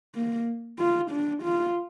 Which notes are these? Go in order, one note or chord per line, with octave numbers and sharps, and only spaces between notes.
A#3
F4
D4
F4